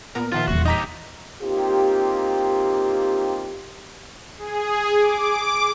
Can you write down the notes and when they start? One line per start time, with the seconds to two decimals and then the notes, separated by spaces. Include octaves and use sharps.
0.15 A#2 B3 A#4 A#5
0.32 A#2 D#3 F3 F4 E5 F#5 C6
0.48 D#1 E2 F#4
0.66 D#4 G4 D#5 A#5 B6
1.42 A#3 C4 D#4 F4 G4
4.37 G#4
4.97 D6